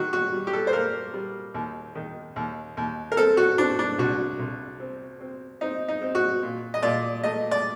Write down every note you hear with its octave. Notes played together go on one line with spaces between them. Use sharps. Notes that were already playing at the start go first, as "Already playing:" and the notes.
Already playing: D#3 F#4
F#4
G3
G4
A4
C5
A#3 A#4
G3
D#2
D#3
D#2
D#2
A#4
C4 A4
F#4
C4 D4
D4
C2 F#4
C2
C4
C4
C4 D#4
D#4
C4
F#4
A#2
D#5
A#2 D5
A3 D#5
D5